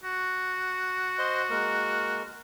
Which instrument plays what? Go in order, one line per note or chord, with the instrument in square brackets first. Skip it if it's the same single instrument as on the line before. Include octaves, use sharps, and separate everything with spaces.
[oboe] F#4
[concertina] C5 D#5 C6
G#3 A#3 A#4